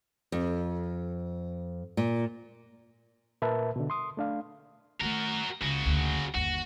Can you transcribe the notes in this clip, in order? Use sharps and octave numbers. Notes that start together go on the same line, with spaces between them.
F2
A#2
A#2 A#4 B4 E5 A5
B2 D3
C6 D#6
A3 D4 F5
D#3 A3 F#4 A#4
C#2 C#3 F#4
F#1 D2
G1 D#2 F#4